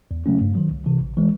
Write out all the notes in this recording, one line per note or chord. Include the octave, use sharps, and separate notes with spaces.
E2
C#3 F#3 A3 C#4
G2
D#3 F#3
C2
C3 E3
A1
E3 G#3